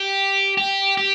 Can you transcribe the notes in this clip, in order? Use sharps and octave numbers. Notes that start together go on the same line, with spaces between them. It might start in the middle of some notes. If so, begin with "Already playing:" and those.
Already playing: G4
G4
G4